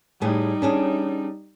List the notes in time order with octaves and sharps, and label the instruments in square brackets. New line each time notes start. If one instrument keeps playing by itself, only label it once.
[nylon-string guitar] A2 G4 G#4 [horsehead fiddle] G3 D#4
[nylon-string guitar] C#4 D4 G#4